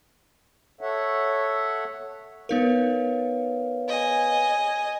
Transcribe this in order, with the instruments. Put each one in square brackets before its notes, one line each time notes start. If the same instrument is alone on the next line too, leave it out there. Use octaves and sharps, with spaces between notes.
[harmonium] A4 C#5 E5 F#5
[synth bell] B3 D#4 A#4 [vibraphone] B4 C#5 F5
[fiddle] D#5 G#5